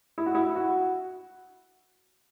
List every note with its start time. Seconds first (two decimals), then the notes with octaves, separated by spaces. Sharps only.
0.18 E4
0.26 F#4
0.35 E4
0.55 F#4